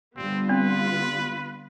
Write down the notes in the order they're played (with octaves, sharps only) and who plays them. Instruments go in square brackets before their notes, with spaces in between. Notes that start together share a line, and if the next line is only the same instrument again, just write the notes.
[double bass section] D3 G3 [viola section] B3 F4 [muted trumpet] C4
[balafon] C4 [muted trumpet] B4